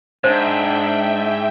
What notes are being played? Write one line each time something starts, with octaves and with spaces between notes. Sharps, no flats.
G#2 D4 C5 E5 G5